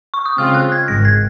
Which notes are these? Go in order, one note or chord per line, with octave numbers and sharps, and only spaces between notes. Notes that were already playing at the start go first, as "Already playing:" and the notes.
C#6
D#6
C#3 G#3 C4 F4 F6
F#6
G#6
G#1 G#2 D#3 G#3 A#6
G#6